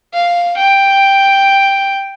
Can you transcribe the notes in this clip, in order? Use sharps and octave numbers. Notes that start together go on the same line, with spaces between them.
F5
G5